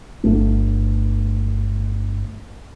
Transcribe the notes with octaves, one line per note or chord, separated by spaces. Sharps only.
G1 F#3 A3 D4